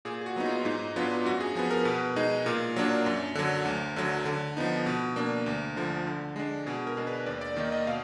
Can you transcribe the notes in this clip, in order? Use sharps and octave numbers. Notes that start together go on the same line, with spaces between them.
A#2 G#4
G#4
F#4
F#3 B3 D#4
F4
F4
G#2 D#4
F#3 B3 D4 F4
F#2 F#4
G#4
F3 B3 G#4
A#4
B2 B4
G#3 D#4
A#2 A#4
F#3 A#3 D4
F#2
D3 F#3
D2
D3 F#3
D3
F3 B3 D#4
B2
A#3 D4
D2
D3 F3
D3
G#3 D4
B2 G#4
A#4
G#3 D4
B4
D#2 D5
D5
D#3 A#3 D#4 D5
D#5
B2 F5